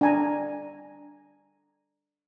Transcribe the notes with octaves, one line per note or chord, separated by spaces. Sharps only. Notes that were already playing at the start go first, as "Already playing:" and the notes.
D4 G#5 A#5